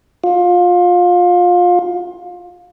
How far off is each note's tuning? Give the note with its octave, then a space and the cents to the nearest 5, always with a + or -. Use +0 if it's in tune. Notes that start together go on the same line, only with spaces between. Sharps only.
F4 +25